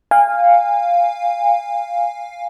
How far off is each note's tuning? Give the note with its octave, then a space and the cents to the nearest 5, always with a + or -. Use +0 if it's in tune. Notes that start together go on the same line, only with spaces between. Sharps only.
F5 +0 G#5 -30